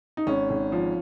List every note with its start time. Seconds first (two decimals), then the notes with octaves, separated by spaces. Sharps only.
0.17 D#4
0.27 G#1 C#4
0.50 G#1
0.72 F3